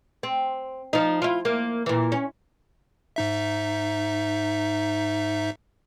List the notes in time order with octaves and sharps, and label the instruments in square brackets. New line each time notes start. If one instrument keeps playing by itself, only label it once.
[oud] C4
F3 D#4
E4 F4
A#3
A#2 E3
C#4
[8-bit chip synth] G#2 D#4 E5